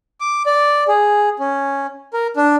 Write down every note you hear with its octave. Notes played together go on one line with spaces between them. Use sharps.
D6
D5
G#4
C#4
A#4
D4